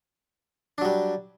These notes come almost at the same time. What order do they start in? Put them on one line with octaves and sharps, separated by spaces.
D4 F#3 G3